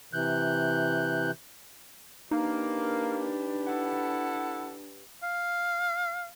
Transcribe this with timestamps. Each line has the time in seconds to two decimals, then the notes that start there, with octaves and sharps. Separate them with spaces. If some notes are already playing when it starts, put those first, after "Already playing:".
0.13 C3 E3 F#6 G6
2.31 A#3 D4 D#4 G4 B4
3.67 E4 A4 F#5
5.23 F5